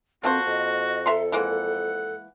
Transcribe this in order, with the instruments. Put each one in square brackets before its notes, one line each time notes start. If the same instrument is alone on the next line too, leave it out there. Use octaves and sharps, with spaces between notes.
[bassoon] F2 [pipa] A#3 A4 C5 [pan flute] C4 [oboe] F#4
[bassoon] F2 [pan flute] D#5
[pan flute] A4 [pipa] E5 A#5 C6
[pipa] E3 G#3 A#3 [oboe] F#5